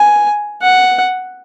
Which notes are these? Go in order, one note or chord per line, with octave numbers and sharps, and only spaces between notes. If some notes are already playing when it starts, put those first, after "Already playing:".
Already playing: G#5
F#5